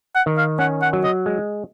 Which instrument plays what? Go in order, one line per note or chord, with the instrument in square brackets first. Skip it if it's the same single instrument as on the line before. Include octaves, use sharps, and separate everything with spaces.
[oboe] F#5
[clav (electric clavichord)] D#3
[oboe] F5
[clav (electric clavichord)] C#4 [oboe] F#5
[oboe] F#5
[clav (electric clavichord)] F#3
[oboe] D#5
[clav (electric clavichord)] G#3